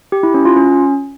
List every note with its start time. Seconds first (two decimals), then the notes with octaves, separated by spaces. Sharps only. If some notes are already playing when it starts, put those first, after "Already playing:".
0.12 G4
0.23 E4
0.34 C#4
0.45 F4
0.56 C#4